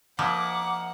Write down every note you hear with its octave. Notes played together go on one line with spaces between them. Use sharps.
F3 A#3 D#5 E5 F#5 D6